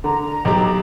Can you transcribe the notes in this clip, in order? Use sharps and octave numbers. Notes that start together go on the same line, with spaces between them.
D3 A#5
B1 G4